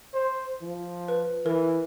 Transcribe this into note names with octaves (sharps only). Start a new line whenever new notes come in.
C5
F3
B4
E3 A#4